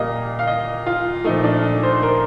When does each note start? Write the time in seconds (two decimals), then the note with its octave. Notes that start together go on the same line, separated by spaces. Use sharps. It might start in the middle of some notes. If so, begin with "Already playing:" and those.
Already playing: A#2 G3 A#3 D#5 F5
0.39 F5
0.47 D#5
0.86 F4
1.24 A#2 F3 A3 D#4
1.44 D4
1.63 D#4
1.83 C5
2.03 A#4